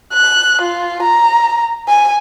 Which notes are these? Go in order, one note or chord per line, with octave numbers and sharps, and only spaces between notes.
F#6
F4
A#5
G#5